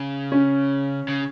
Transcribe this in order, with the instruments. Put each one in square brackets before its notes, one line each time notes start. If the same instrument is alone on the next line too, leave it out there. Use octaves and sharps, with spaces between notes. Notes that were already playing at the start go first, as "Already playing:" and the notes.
Already playing: [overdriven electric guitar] C#3
[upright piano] C#4
[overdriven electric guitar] C#3